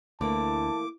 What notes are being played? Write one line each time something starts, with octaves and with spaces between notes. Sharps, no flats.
D2 E3 A3 A#3 A5 D6